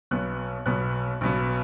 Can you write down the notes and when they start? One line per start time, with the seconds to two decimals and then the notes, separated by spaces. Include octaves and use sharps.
0.11 B1 B2 B3 F#6
0.66 B1 B2 B3 F#6
1.21 B1 B2 B3